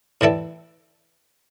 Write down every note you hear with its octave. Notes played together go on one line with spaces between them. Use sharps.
A2 E3 G3 E4 A4